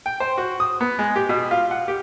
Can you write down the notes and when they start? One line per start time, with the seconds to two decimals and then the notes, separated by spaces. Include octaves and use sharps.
0.06 G5
0.20 C5
0.38 F#4
0.60 D#6
0.81 B3
0.99 G#3
1.16 G4
1.29 B2
1.51 F4
1.71 F#5
1.88 G4